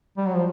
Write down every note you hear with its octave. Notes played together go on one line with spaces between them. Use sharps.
G3
F#3
F3